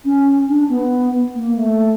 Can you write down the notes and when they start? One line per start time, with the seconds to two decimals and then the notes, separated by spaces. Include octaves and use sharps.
0.05 C#4
0.49 D4
0.69 B3
1.35 A#3
1.56 A3